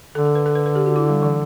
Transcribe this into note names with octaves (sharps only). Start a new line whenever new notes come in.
D3 A4
A4
B4
A4
B4
B4
G4
F#4
E4
G3
E3